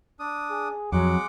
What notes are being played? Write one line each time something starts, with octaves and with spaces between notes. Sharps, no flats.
D4 D#6
G#4
F2 F#3 G#3 F#5 D6